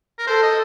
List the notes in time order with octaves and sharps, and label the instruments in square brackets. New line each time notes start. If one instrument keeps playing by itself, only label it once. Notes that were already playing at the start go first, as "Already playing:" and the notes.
[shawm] A#4
[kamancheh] A4 [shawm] C5
[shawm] D#5